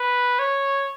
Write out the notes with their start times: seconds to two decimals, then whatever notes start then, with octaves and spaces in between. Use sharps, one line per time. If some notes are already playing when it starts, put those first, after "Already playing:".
Already playing: B4
0.39 C#5